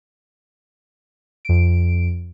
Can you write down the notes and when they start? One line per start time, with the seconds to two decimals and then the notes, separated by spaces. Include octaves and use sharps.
1.45 F2 D7